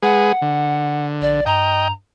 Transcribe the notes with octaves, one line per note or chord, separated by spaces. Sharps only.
G#3 G#4 B4 F#5
D3
A#1 D5
G2 D#5 G5 A#5